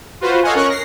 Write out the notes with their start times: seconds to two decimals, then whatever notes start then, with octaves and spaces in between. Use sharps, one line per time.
0.21 F4 F#4 B4 C5
0.43 A4 C#5 D#5 F5 F#5 G#5
0.55 C#4 A#4 C#5 C#6 F#6
0.70 A#6 C7